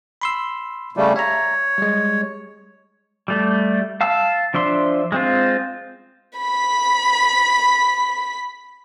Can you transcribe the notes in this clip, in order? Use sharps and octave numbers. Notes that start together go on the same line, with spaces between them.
B5 C6 E6
C#3 G3 A3
C#5 E5 A#5
G3 G#3
G3 A3
F5 A5 E6
F3 D4 E5 C6
G#3 C4 F4
B5 B6